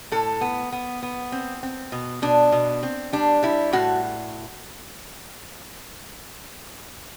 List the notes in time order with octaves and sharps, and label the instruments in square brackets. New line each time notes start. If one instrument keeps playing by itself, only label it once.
[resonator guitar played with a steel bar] A2 A4
B3
B3
B3
C4
C4
B2
B2 D4
B2
C4
G3 D4
G3 E4
A2 F#4